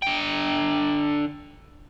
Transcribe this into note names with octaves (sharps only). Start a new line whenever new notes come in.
D3 G5